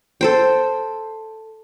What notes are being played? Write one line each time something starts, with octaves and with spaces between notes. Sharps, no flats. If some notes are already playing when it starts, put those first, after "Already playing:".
A4 C5 G5